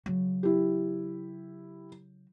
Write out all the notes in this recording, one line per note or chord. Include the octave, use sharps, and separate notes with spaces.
C#3 F#3
E4 G4